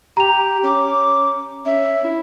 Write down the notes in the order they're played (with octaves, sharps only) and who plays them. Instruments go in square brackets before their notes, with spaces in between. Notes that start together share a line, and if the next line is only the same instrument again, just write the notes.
[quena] G4 [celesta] A#5 F7
[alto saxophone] C#4 [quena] D6
[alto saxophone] C#4 [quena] E5
[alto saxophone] E4